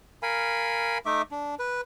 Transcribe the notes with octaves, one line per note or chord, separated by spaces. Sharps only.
A#4 F5 G#5 B5
A3 D#4 E5 D6
D4
B4